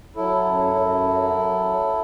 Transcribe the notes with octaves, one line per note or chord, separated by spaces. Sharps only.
F#3 E4 A4
F#2
F#2
F#3